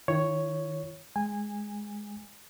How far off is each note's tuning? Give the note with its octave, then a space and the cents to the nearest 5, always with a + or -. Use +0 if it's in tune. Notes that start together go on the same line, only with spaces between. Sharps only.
D#3 +0 E4 +45 C#5 +0
G#3 +0 G#5 -20